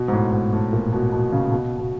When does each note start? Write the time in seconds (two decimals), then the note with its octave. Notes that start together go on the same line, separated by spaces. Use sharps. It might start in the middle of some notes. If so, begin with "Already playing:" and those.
Already playing: B2
0.08 G#2
0.13 A2
0.33 G#2
0.53 A2
0.73 A#2
0.92 B2
1.12 B2
1.32 C#3
1.52 B2
1.78 B2